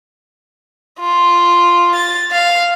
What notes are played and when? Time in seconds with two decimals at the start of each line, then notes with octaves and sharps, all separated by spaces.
0.99 F4
1.95 A6
2.32 F5